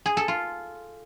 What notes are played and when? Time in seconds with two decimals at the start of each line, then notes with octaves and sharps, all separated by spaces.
0.06 G#4
0.17 A4
0.28 F4